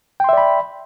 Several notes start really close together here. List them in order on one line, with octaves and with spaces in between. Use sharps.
G5 C6 E5 D5 B5